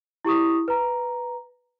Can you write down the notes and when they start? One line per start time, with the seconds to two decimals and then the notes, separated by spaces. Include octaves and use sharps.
0.25 E4 G4 C#6 D#6
0.68 B4 A#5